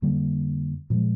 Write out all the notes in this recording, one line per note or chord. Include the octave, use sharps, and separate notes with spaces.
F2 D3 G3 A#3
A#2 F3 G#3